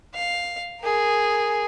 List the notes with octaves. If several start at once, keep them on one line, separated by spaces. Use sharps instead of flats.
F5
G#4 A#4